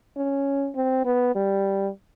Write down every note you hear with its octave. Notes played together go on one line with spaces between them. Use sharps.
C#4
C4
B3
G3